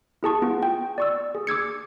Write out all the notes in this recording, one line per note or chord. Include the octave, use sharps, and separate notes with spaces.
E4 G#4 A5 C#6
B3 F4
G5
D5 C#6 E6
G#4
D6 E6 G#6 C#7